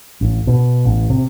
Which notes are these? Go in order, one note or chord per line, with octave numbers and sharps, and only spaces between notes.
A1
B2
A1
C3